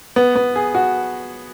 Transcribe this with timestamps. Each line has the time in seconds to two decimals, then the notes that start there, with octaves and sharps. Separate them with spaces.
0.16 B3
0.35 B3
0.56 G#4
0.75 F#4